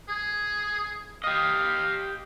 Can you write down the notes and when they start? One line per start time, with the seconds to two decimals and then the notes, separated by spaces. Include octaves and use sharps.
0.08 G#4
1.24 G4 D#5 F5